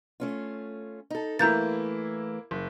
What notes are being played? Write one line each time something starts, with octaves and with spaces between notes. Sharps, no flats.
A3 C#4 F4
D#4 A4
E3 A3 A#3 E4 A#5 G6 A6
F#1